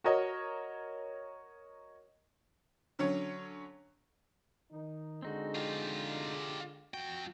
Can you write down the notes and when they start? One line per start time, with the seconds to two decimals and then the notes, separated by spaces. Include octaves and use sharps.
0.04 F#4 A#4 C#5 D#5
2.99 D3 F#3 C#4 C#5
4.71 D#3 D#4
5.22 D3 G#3 C4 D#4 F#4
5.55 F4 G4
6.94 F2 F#4 G5